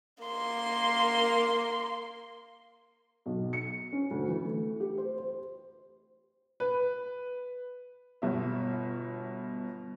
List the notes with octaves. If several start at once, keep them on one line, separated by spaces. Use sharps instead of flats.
A#3 C6
B1
C#7
C#4
D2
E3
A3
G4
C5
C5
B4
G1 B2 E5